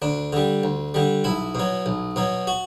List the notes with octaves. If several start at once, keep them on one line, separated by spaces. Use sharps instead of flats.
D2 D4
D3 G3
D2
D3 G3
B1 E4
B2 F#3
B1
B2 F#3
F#4